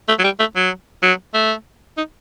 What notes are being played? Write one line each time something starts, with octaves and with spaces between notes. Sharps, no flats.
A3
F#3
G3
A3
F#3
F#3
A3
D#4